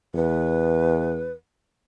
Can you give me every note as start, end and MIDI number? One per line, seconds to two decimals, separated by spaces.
0.15 1.34 40
0.15 1.31 71